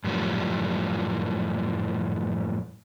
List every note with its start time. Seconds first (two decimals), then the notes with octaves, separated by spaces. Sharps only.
0.04 F#2 A2 F3 G3